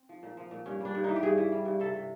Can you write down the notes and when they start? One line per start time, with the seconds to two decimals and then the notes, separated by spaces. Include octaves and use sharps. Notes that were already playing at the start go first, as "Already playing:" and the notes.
Already playing: C4
0.09 F3
0.23 A#2
0.37 F3
0.51 A#2
0.66 G2 C#4
0.80 G3 D4
0.95 G2
1.04 E3 D#4
1.16 G4
1.23 G2 G#4
1.38 E3
1.52 G3
1.65 G2
1.80 C3 A4
1.94 C3